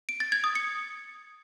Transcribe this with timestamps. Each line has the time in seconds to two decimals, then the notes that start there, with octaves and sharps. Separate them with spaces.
0.09 D7
0.20 A6
0.32 G#6
0.44 D#6
0.55 C#7